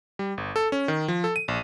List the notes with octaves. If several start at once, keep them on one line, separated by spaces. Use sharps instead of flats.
G3
G1
A4
C#4
D#3
F3
A4
D#7
A#1